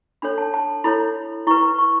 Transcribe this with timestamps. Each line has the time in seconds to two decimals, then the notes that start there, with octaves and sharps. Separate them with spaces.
0.22 D4 A4 C#5 B5
0.38 A5
0.54 A5
0.84 E4 A4 C#5 B5
1.47 E4 B4 C#6
1.79 C#6